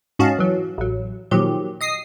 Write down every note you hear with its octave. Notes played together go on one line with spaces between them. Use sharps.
G#2 C#4 F#4 D#5 F5 A5
E3 F#3
A1 F#3
A#2 D#3 F3 F#3 G4
D#5 D#6 C7